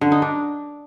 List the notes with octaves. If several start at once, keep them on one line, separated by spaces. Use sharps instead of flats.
D3
D#4
D4